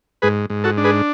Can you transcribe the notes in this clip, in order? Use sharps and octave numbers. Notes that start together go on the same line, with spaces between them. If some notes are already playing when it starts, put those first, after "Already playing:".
G#2 G#4 B4
G#2
F#4 A4
D4
G#4 B4